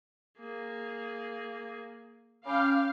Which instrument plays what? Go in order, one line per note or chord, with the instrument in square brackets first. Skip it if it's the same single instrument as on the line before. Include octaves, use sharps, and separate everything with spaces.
[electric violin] A#3 G#4
[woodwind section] C#4 [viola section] F5 [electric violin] G5 D6 [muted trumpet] B5